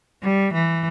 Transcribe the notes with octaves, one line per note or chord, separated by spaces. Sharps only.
G3
E3